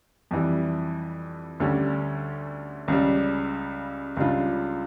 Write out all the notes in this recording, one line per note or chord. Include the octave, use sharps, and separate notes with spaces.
F2 E3 G3
D2 D3 G3 C#4
C#2 C#3 G3
C#2 C#3 G3 D4 F4